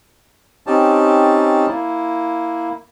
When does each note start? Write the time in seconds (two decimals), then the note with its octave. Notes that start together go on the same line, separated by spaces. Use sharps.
0.67 C4 C#4 D#4 G4 A5
1.67 A#3 E4